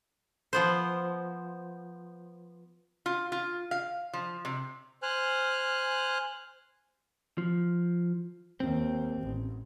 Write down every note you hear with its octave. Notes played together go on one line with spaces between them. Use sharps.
F3 B3 C5
F4
F4
F5
F3
C3
C5 G#5 F6 F#6
F3
D#2 C4
A1